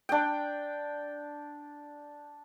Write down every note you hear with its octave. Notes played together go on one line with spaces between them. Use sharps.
D4 G5